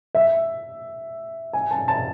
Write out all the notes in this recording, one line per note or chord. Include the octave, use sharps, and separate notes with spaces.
E5
G#5
A5
A5